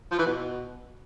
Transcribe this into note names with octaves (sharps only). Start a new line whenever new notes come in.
F3
E3
B2